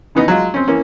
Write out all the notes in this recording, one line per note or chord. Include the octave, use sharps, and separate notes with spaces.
C#3 E3 B3 D#4
F#3 G#3 F4
C4 C#4
E3 A#3 C#4